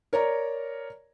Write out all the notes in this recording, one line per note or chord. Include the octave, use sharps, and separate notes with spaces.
A#4 C#5 D5 A#5